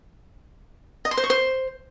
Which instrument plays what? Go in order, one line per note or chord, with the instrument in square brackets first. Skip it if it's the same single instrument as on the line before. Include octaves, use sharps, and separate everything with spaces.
[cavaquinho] D#5
C6
C5
C#6
C5